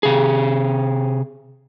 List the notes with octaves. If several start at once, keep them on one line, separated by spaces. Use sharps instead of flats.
C3 G#4